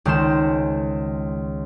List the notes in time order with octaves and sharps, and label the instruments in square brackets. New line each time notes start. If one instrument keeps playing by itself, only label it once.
[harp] C#2 D#3 G#3 C5 E7